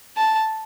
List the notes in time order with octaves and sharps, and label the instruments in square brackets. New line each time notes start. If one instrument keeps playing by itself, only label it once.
[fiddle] A5